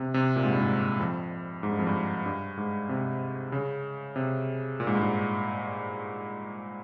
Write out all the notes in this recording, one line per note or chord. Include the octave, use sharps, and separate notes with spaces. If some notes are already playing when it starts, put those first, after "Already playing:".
Already playing: C3
C3
A#2
G#2
G2
G#2
F2
G#2
G2
F2
G2
G2
G#2
C3
C#3
C3
A#2
G#2
G2
G#2